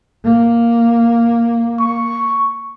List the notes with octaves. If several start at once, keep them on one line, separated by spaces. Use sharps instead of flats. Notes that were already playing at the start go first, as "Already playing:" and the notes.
A#3
C#6